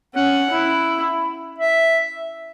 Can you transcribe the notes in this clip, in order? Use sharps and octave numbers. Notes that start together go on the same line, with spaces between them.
C#4 F#5
E4
E5